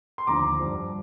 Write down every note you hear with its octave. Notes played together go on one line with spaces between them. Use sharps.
C6
D#2 D3 F3 A#5 D6
G2 F3